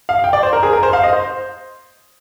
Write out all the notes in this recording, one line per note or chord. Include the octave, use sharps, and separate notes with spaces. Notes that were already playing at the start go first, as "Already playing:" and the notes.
F5
G5
D5
C5
A#4
G#4
A#4
C5
F5
D#5
C5